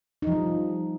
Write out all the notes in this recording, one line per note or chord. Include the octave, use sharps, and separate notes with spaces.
F3 G3 D#4